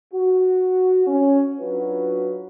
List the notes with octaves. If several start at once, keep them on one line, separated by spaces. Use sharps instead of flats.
F#4
C#4
F#3 D4 F4 F#4 B4